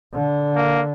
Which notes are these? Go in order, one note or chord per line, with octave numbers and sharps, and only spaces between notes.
D3
A#3